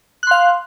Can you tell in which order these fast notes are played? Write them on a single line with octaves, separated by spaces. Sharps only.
F#6 C6 F5